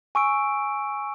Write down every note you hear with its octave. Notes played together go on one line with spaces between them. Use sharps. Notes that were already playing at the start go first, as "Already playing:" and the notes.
G#5 C#6 E6 D7